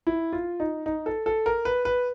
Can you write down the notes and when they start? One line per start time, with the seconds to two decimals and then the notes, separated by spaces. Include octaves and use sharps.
0.07 E4
0.32 F4
0.60 D#4
0.86 D#4
1.06 A4
1.26 A4
1.46 A#4
1.65 B4
1.85 B4